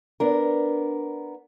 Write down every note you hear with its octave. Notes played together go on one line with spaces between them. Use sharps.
B3 D4 A#4